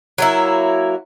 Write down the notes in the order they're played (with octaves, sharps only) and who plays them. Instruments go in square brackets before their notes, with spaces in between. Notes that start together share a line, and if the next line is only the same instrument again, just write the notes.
[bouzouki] F#3 A#3 E4